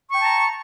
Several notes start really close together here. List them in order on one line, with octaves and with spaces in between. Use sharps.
C#6 G5 A5 A#5